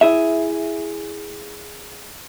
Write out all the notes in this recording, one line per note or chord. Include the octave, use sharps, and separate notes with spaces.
E4 G#4 E5